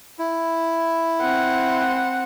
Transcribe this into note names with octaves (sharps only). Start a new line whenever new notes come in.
E4
C4 F#5